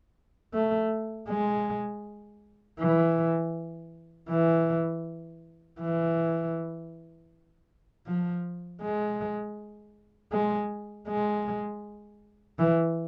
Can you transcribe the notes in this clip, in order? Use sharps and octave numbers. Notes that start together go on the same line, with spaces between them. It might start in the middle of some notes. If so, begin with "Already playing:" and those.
A3
G#3
E3
E3
E3
F3
G#3
G#3
G#3
E3